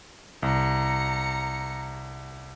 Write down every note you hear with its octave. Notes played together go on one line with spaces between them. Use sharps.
C2 A#5 C#7